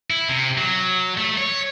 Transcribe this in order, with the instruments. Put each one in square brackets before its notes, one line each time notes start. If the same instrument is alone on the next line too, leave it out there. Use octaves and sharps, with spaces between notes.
[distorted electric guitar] E4
C3
F#3
A3
C#5